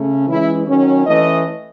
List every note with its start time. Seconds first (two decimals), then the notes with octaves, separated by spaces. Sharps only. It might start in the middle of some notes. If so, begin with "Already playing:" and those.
Already playing: C#3 A3 C#4
0.27 E3 G#3 C#4 E4
0.66 D#3 F#3 C#4
1.05 E3 A3 C#4 D#5